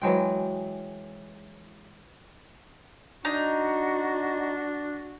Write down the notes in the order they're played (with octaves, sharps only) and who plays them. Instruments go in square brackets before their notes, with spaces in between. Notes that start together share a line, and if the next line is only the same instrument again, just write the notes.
[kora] E3 F#3 G#3 G5
[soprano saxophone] D4 [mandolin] D#4 [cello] F#4